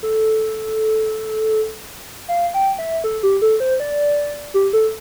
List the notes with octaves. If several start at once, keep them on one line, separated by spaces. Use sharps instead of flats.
A4
F5
G5
E5
A4
G4
A4
C5
D5
G4
A4